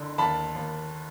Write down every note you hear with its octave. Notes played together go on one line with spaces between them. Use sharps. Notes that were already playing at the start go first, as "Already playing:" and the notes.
Already playing: F#1 D3
D#2 A5 B5
D#2